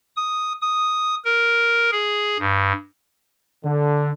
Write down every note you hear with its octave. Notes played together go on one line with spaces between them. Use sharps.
D#6
D#6
A#4
G#4
G2
D3